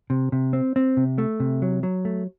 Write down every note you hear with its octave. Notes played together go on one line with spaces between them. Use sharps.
C3
C3
C4
C4
C3
A3
C3
F#3
F#3
A3